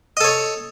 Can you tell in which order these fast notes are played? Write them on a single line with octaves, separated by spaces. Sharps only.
D#5 A4 C#5